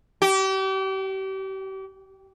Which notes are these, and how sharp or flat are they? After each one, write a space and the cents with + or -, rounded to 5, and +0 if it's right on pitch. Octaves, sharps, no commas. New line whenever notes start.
G4 -35